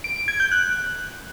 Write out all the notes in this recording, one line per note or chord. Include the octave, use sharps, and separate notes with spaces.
D7
D7
G#6
G6
F#6